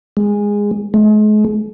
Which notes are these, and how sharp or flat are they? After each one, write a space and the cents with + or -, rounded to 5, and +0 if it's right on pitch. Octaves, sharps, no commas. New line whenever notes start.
G#3 -15
G#3 +40